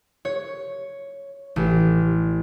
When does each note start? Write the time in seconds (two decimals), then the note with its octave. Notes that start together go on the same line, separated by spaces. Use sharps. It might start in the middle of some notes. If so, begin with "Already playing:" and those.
0.25 C#5
1.56 A1